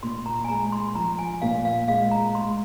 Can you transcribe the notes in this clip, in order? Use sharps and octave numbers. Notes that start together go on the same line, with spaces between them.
A#2 C6
A#5
G#5
G#3 A#5
C6
F3 A#5
G#5
A#2 F5
F5
G#3 F5
A#5
G#3 C6